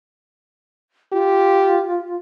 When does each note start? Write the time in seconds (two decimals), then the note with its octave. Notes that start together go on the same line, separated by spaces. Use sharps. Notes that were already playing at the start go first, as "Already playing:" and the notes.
1.13 F4 G4